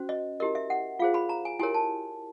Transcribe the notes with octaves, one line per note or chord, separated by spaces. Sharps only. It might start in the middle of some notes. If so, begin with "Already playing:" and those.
Already playing: C#4 F#4 C5
D#5
E4 G4 A#4 D#5
E5
F#5
F4 G#4 C5 F5
B5
A#5
G#5
E4 G4 A#4 C#5 G#5
A5